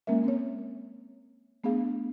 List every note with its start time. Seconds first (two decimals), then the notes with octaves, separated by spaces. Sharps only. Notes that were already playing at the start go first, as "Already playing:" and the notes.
0.07 G#3 A#3 C#4 A#4 E5
0.24 C4 C#5
1.64 A3 B3 D4 G#4 F5